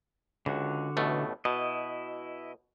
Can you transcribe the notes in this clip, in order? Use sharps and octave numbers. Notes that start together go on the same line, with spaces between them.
C#2 D3 F#4
A1 B2 A3
B2 E4 D#5